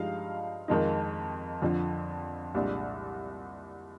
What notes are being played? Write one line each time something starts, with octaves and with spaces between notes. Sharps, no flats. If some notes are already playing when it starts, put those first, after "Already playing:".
Already playing: G2 F3 G#3 D#4 F5
F2 D#3 G#3 D#4
F2 D3 F3
C2 A#2 G#3 D4